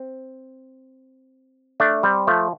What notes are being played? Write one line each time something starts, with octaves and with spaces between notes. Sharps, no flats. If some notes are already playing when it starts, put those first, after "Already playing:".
Already playing: C4
A3 D4
G3 C4
F3 A3